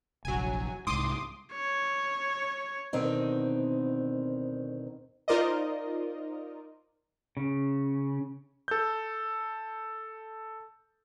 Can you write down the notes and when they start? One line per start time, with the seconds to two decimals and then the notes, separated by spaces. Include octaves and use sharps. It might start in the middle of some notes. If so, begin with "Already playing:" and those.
0.25 F1 A#1 F#3 G#5
0.87 C2 G#2 C6 D6 D#6
1.53 C#5
2.93 D2 B2 D#3 C4 D#4
5.28 D#4 F4 A#4 C5 D5 D#5
7.37 C#3
8.68 A4 G6